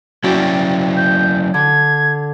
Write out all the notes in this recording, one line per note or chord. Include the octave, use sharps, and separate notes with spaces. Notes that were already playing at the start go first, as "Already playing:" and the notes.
F#3 C#4 E4 F#4 D5 G5
G6
D3 G#6